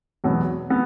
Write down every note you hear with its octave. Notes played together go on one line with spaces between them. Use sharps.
E2 B2 F#3 B3
B3